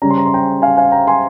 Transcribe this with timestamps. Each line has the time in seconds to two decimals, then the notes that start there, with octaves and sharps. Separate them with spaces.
0.02 C#3 G3 C#4 A#5
0.11 C6
0.18 A#5
0.26 C6
0.34 G5 A#5
0.62 F5 G#5
0.77 F5 G#5
0.92 G5 A#5
1.07 G#5 C6